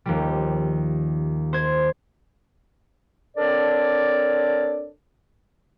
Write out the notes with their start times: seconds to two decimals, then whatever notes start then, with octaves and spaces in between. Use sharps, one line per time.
0.06 D#2 F3 G3
1.53 C5 G#6
3.37 C4 D4 A4 A#4 C#5 D5